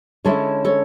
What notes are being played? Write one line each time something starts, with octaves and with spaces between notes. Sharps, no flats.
D3 G#3 C#4 E4 A4 C#5
A4 C#5